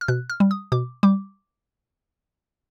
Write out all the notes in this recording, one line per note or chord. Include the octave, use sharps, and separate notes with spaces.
F6
B2 F#6
F6
G3
D#6
B2 D6
G3 D6